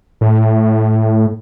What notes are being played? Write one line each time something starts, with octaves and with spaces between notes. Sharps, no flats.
A2